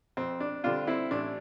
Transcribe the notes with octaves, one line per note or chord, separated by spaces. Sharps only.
F2 C4
D4
D3 G3 C4 D4 F4
C4 E4
A1 D4